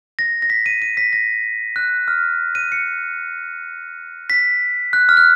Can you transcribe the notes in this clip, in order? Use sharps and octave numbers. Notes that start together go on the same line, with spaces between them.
A#6
A#6
B6
D#7
D#7
B6
A#6
F#6
F6
D#7
C#7
B6
F#6
F6
F#6